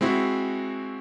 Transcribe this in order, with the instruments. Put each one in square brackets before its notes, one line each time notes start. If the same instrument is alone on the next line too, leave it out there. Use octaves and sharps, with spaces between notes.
[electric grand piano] G#3 C4 E4 F#4